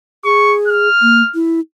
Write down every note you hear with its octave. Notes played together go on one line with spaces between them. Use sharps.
G#4 C#6
F6
A#3
E4